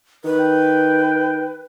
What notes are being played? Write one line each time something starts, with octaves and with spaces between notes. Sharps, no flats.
D#3 B4
G5